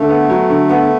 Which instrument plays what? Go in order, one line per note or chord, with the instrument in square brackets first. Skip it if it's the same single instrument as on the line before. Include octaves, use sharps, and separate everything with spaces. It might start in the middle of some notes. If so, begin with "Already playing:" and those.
Already playing: [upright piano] D3 [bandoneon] A3
[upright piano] B3
F#3
D3
B3